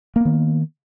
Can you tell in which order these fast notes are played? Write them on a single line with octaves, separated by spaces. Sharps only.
A#3 B3 D#3